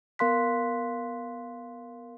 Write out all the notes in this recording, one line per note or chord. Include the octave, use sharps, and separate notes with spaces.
B3 A#4 F5 C6 F#6 B6